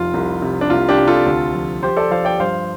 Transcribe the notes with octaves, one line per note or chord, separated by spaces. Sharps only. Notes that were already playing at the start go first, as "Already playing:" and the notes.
Already playing: F1 F4
C2
C3
D4
C2 F4
D4 G4
C3
F4 A4
D2
F3
F3 G4 C5
A4 D5
F3 C5 F5
D5 G5
G2 C5 F5